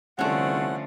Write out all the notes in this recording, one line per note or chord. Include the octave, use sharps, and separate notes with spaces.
C2 D3 F3 A3 C#4 F#5